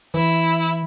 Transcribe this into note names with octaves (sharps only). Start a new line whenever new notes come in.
E3 E4